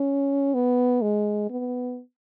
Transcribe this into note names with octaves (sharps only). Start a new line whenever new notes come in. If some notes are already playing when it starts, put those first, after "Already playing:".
Already playing: C#4
B3
G#3
B3